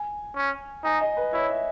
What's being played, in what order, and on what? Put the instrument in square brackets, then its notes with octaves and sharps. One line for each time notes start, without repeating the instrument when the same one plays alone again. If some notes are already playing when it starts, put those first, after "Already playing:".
Already playing: [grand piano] G#5
[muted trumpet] C#4
[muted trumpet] D#4 [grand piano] G#5
[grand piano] D#5
B4
[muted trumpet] E4 [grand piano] C#5
[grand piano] E5